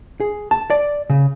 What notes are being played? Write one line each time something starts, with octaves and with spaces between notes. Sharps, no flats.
G#4
A5
D5
C#3